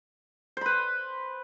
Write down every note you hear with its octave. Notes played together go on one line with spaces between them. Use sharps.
B4 C5 B5